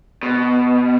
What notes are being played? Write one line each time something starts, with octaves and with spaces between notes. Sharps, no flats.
B2